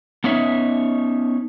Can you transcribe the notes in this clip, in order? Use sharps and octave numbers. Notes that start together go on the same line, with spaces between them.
B3 C#4 D#4 C#5 E5